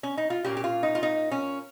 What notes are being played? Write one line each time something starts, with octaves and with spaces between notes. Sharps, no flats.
C#4
D#4
F4
A#2 G3 A#3 C#4 G4
G4
F4
D#4
F4
D#4
C#4